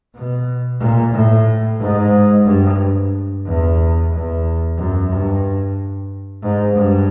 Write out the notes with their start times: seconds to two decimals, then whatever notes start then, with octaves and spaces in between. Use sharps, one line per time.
0.14 B2
0.80 A#2
1.14 A2
1.80 G#2
2.45 G2
3.45 E2
4.11 E2
4.78 F#2
5.11 G2
6.42 G#2
6.75 G2